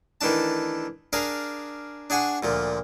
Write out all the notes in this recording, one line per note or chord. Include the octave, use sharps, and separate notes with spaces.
D#3 E3 A3 D4 A5
D4 G#4 A#4 D5 F5
D4 G#4 F#5 G#5 C#6
D2 A#2 F3